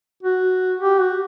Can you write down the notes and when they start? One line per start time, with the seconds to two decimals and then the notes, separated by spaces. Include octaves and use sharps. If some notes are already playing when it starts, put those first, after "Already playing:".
0.23 F#4
0.81 G4
1.00 F#4